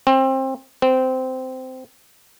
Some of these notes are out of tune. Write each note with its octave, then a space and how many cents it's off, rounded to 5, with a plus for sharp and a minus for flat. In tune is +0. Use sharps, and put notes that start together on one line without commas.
C4 +25
C4 -15